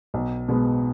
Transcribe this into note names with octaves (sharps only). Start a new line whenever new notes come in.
B1
B2 G#3 B3